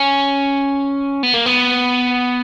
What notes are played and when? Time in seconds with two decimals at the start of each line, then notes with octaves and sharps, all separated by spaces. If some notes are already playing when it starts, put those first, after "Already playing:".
Already playing: C#4
1.23 B3
1.34 A#3
1.46 B3